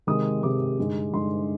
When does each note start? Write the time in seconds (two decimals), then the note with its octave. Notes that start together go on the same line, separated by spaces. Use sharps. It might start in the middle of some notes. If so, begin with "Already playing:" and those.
0.07 C3 D#3 G#3 D#6
0.43 C3 D#3 G#3 D6
0.78 G2 D3 G#3 D#4
1.13 G2 D3 G#3 D#4 C6